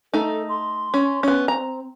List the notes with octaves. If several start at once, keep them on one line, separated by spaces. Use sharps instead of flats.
A3 D#4 A4
C6
C#4
B3 C#4
C4 A#5